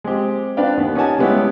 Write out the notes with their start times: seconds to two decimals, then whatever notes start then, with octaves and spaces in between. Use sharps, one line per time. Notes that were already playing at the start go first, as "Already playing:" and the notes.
0.04 G#3 C4 G4
0.57 C4 D4 B4 D5 F5 G5
0.77 D#2 B3
0.95 C#4 D#4 G4 F#5 G#5 A5
1.19 G3 G#3 B3 C#4 E4 G4